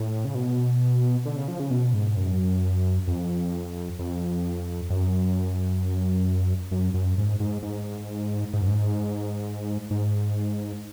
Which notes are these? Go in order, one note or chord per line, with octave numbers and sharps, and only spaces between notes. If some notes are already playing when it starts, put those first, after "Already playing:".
Already playing: A2
C#3
B2
D3
C#3
F3
C#3
B2
G#2
F#2
F2
F2
F#2
F#2
F#2
G#2
G#2
G#2
G#2
F#2
G#2
G#2